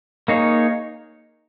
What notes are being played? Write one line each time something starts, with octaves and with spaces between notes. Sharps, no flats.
A#3 D#4 G#4 C#5